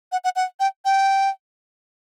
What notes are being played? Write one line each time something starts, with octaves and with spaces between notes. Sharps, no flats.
F#5
F#5
F#5
G5
G5